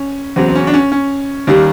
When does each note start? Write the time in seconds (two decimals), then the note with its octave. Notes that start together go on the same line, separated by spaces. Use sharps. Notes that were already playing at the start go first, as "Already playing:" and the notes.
Already playing: C#4
0.36 E2 C#3 F#3 C4
0.49 C4
0.55 C#4
0.67 D4
0.74 C#4
0.92 C#4
1.47 D#2 D#3 G3